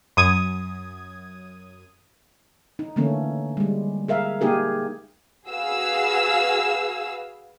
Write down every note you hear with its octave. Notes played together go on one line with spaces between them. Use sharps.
F#2 D#6 G#6
D#4
D3 E3 A3 A#3 C#4
G3 G#3
G#4 A#4 E5 F5
A#3 D#4 G4 G#4 A#4
F#4 G#4 B4 F5 E6